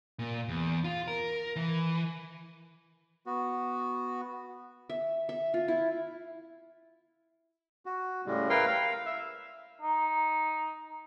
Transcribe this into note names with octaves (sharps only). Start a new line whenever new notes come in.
A#2
E2
F4
A#4
E3
B3 F#4
E5
E5
F4
E4
F#4
A2 C#3 G3 G#3
E4 A#4 B4 F5 G5 C6
F5
E5
D#4